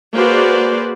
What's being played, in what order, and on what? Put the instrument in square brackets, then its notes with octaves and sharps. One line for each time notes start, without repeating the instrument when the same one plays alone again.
[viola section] A#3 F#4 G#4 B4 C5 D5